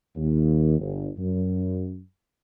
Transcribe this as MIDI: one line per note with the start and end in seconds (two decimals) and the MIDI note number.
0.16 0.77 39
0.79 1.09 31
1.17 1.98 42